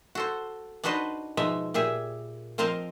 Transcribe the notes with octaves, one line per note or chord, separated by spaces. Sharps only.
F#4 A4 C5
D4 D#4 F#4 B4 C5 D#5
B2 F3 G#3 D#4 E5
A#2 G4 G#4 E5
F3 C4 A#4 C5 D#5 F5